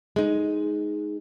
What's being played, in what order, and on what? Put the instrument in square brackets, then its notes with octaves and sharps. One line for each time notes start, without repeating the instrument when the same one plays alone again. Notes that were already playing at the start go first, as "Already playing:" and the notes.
[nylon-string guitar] G#3 D#4